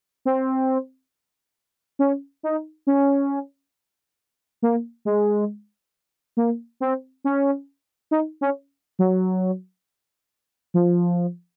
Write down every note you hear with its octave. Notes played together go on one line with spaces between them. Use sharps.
C4
C#4
D#4
C#4
A#3
G#3
A#3
C4
C#4
D#4
C#4
F#3
F3